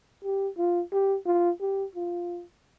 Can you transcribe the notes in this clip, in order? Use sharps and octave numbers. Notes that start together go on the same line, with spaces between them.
G4
F4
G4
F4
G4
F4